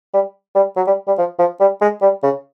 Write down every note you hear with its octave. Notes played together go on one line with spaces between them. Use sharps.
G3
G3
F#3
G3
G3
F3
F3
G3
G#3
G3
C#3